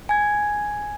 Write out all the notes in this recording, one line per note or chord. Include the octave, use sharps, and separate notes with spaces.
G#5 G#6